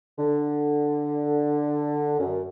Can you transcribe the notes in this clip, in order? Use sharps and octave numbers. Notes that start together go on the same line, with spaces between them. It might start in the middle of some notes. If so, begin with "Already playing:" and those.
D3
F#2